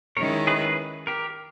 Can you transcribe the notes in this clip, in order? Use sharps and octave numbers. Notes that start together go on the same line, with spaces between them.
D#3 G#3 C#4 E4 A#4 C#5
G#4 B4
G#4 B4
G4 A#4